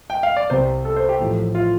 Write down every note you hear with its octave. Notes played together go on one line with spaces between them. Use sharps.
G5
F5
D5
C2 C3 G3 C5
A4
C5
G4
A1 A2 F3 A3
F4